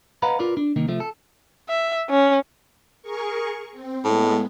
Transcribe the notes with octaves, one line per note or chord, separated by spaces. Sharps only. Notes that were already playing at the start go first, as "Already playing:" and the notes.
B4 D#5 F5 F#5 A#5 B5
F4 A#4 B4 D5
D4
C2 D#3 A#3 D#4
C3 F3 A3
A4
E5
C#4
G#4 A#4 C#6
C4
A2 G#3 B3